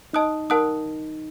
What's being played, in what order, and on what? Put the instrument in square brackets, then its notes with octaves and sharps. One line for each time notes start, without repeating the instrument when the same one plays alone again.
[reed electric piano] D#4 [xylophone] D#5 A5 D#6 F#6
[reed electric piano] D#4 [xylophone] A#4 F#5 A5 D#6 F#6